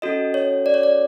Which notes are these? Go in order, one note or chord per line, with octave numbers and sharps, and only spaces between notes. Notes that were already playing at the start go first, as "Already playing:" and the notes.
C#4 F#4 A4 D#5
C#5
D5
C#5
D5